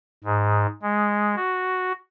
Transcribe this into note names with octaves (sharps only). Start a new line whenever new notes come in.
G#2
G#3
F#4